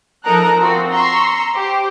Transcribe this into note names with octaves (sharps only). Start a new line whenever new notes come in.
F3 D#4 A4 A#4 A#5 F#6
C4 F4 F#4
A#5 C6 C#6 E6
G4 C5